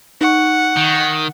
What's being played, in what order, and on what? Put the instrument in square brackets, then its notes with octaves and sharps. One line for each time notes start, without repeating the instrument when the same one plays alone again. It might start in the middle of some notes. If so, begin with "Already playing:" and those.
[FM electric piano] D#4 C#6 [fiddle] F#5
[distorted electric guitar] D#3